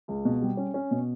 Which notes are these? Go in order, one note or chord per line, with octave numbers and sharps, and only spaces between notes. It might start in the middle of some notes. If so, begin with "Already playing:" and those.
C#2
B2
G3
C#4
C#4
B2